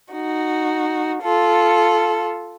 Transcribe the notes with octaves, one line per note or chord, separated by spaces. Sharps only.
D#4 F#4
F4 A4